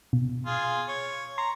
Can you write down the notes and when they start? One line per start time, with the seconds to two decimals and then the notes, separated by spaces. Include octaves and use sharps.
0.13 B2
0.46 F4 G#4
0.88 C#5
1.38 A#5 C6